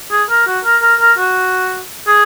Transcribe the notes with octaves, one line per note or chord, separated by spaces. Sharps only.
G#4
A#4
F#4
A#4
A#4
A#4
F#4
G#4